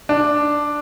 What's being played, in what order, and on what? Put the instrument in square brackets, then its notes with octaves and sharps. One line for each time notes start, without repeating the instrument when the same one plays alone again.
[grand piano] D4